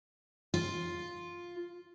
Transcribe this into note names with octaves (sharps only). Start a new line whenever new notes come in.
F4